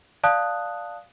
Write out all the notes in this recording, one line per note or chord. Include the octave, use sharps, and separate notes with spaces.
D5 F5 A5 D#6 F#6